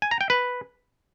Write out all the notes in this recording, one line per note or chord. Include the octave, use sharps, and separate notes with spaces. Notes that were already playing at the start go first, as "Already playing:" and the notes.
G#5
A#5
G5
B4